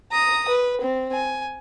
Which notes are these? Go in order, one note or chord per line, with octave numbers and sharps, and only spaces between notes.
A#5 D#6
B4
C4
G#5